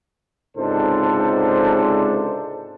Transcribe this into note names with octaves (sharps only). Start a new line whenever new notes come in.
C#2 G#2 C3 D4 A4 C5